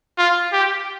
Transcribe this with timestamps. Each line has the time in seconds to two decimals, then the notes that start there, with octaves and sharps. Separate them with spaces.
0.18 F4
0.53 G4